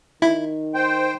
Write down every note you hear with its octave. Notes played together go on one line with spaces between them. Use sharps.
D#3 E4
C5 G5